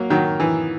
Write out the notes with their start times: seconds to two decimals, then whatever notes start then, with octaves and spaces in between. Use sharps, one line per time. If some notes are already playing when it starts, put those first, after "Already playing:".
Already playing: F#3 A#3
0.10 D#3 F#3
0.40 E3